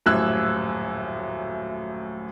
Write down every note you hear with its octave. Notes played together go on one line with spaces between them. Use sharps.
D#1 F#2 A2 E6 F#6 G#6